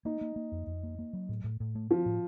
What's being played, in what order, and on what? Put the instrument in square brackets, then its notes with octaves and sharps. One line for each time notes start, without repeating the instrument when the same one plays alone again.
[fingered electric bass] A#3 [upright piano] D#4
[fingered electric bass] A#3
A#3
F2
F2
A#3
A#3
F#3
A2
A2
A2
A3
[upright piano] F3 [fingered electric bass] C4
[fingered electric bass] A2